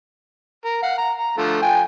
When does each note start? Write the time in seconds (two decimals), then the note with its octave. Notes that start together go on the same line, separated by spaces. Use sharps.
0.65 A#4
0.83 F5 F#5
0.98 A#5
1.18 A#5
1.38 D3 F3 A3
1.62 F3 G5 G#5